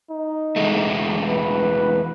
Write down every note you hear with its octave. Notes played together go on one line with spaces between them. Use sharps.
D#4
E2 G#3 A3
B4